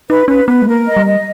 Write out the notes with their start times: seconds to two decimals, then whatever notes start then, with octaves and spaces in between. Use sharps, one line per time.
0.10 D#4 B4
0.28 C#4 B4
0.48 B3 B4
0.62 G#3
0.67 A#3 A#4
0.86 D#5
0.96 G3
1.06 D#5